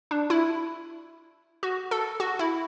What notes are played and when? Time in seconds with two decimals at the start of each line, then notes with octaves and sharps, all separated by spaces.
0.11 D4
0.30 E4
1.63 F#4
1.91 A4
2.20 F#4
2.39 E4